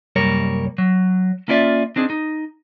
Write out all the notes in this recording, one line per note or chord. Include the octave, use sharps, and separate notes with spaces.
C2 F#2 G3 A#3 A#4 C#5
F#3
A#3 C#4 E4 F4 D5 E5
C4 D4 D#4 G#4
D#4